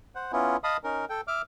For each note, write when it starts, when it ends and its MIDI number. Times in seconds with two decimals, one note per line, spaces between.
0.15 0.32 72
0.15 0.32 78
0.32 0.57 59
0.32 0.57 61
0.32 0.57 64
0.32 0.57 65
0.64 0.77 75
0.64 0.77 77
0.64 0.77 81
0.64 0.77 83
0.64 0.77 87
0.84 1.05 61
0.84 1.05 63
0.84 1.05 70
1.09 1.21 69
1.09 1.21 79
1.28 1.42 76
1.28 1.42 86
1.28 1.42 89